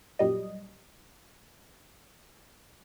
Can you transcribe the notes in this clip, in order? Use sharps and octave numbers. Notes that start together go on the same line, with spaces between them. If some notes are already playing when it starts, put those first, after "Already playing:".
F#2 A#2 G3 D#5